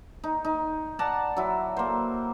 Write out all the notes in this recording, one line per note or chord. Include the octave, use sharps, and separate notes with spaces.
D#4
D#4
D5 F#5 A5 A#5
F#3 E4
A#3 C5